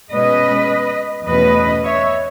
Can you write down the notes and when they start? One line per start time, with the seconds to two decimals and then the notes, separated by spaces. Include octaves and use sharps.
0.11 B2 G#3 C#4 B4 D#5
1.26 E2 B2 A3 C#4 B4 D#5
1.84 C#5 E5